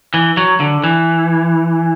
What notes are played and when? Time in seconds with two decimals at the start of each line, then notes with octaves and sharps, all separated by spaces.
0.14 E3
0.37 F#3
0.60 D3
0.84 E3